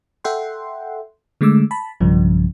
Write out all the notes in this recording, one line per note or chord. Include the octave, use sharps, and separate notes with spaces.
A4 E5 F#5 G5 C6
D3 G#3 A3 D6 E6
A5 B5
B1 G2 C#3 F3